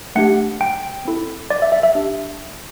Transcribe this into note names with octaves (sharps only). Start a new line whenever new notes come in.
A3 D4 G4 F#5
G5
C4 E4 A4
D5
E5
E5
E5
D4 G4